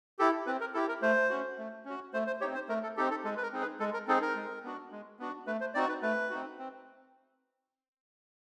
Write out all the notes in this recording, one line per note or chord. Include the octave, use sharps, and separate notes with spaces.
E4 G4 A4
C4 B4
A#4
E4 G4 A4
A#4
A3 C5
C#4 F#4
A3
C#4 F#4
A3 C5
C5
C4 D#4 G4 C#5
C5
A3 A#4
A4
C4 D#4 G4 A4
A4
G#3 A4
B4
A#4
C4 D#4 G#4
B4
G#3 A4
A#4
C4 D#4 G#4 A4
A#4
G#3
B3 D4 F#4
G#3
B3 D4 F#4
A3 B4
C5
C4 D#4 F#4 D5
B4
A3 B4
C4 D#4 F#4
C4